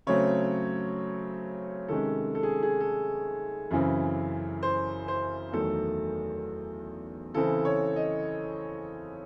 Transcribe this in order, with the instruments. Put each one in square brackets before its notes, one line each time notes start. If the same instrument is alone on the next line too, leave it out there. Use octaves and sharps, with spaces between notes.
[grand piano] C#3 F#3 A3 C4 C#5
C3 D#3 G#3 C#4 A4
A4
G#4
G#4
A4
F#2 C#3 E3 C4
C5
C5
E2 D#3 F#3 A3 A4
C#3 E3 C4 A4
C#5
D#5